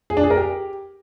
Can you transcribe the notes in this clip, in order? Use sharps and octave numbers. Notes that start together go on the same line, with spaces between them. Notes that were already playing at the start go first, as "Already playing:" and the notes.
G#4
D4
G#4
A#4
G4